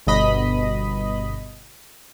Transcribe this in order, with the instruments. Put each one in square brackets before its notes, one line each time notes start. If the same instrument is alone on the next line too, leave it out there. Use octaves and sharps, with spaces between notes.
[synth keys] G1 B2 D#5 B5